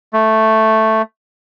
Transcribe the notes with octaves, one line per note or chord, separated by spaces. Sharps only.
A3